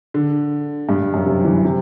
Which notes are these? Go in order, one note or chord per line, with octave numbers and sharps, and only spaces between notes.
D3
G2
F#2
C3
E3
C3